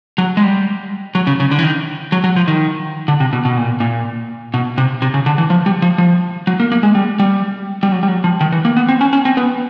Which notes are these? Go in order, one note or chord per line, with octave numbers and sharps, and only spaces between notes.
F#3
G#3
G3
F#3
C#3
C#3
D3
E3
D#3
F#3
F#3
F3
D#3
D3
C3
B2
B2
A#2
A#2
B2
C3
C3
C#3
D3
E3
F3
G3
F3
F3
F#3
A#3
A#3
G#3
G3
G3
G3
F#3
G3
F#3
F3
D#3
E3
A#3
B3
C4
C#4
C#4
C4
B3